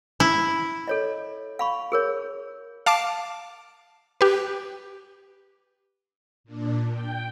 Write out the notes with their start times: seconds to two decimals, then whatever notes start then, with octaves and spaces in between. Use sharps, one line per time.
0.20 E4
0.88 A4 C#5 D#5
1.59 F5 B5 C#6
1.92 G#4 A#4 C#5
2.86 F5 A5 D6 C7 D7
4.21 G4 B4
6.44 A#2 D4
6.89 G5